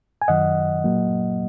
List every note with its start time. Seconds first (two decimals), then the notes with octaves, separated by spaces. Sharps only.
0.22 G#5
0.28 F#2 D#3 F#3 D#5 F#5
0.84 A#2 F#3 A#3